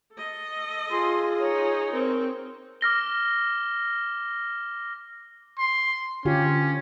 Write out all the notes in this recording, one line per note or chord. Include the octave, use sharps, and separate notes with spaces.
A4 D#5
F4 G#4 C6
D#4 C#5
C4 A#4
D6 F6 A#6 G7
C6
D3 C#4 F4 G4